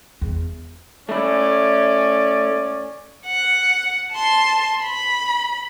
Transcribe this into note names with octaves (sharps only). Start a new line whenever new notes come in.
E2
A3 C#4 E4 D5
F#5
A5 C6
B5